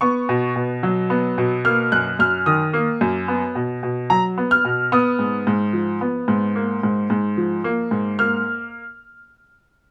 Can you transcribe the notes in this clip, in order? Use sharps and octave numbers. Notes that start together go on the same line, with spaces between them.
B3 C#6
B2
B2
F#3
B3
B2
A#3 F6
F#2 F#6
F#2 F6
D#3 D#6
A#3
F#2
B3
B2
B2
F#3 A#5
B3
F6
B2
B3 D#6
G#2
G#2
F3
B3
G#2
A#3
G#2
G#2
F3
A#3
G#2
A#3 F6